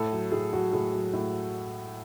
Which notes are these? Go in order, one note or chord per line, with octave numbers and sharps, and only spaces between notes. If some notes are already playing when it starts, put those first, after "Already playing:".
Already playing: A2 A4
F#3
A2 G#4
F#3 F#4
A2 G#4
F#3
A2